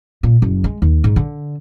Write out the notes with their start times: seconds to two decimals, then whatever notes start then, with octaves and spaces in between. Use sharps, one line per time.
0.23 A#2
0.42 F#1
0.64 G#3
0.82 D#2
1.04 G#2
1.16 D3